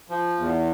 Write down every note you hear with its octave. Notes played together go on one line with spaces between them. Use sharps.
F3
E2